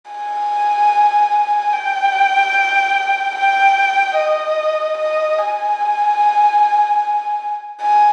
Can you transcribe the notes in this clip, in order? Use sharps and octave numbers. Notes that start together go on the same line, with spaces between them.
G#5
G5
G5
D#5
D#5
G#5
G#5